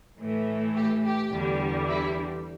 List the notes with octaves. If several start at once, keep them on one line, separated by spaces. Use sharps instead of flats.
A2 E3 A3
G4
G4
E2 D3 G3
E4